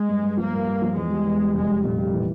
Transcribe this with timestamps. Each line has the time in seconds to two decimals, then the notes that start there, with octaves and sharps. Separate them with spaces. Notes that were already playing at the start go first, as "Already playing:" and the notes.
Already playing: G#3
0.09 G2
0.23 G2
0.37 F3 A#3
0.53 G2
0.67 G2
0.82 F3
0.96 E2 G#3
1.11 G3
1.26 E2
1.41 G3
1.54 F1 G#3
1.69 G3
1.84 F1 A#2
1.99 G3
2.13 E3